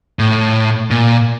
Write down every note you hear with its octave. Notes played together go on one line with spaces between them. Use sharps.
A2
A#2